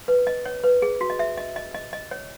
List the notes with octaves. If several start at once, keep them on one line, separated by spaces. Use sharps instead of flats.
B4
D#5
C#5
B4
G#4
F#4
D#5
E5
D#5
D#5
D#5
D#5
C#5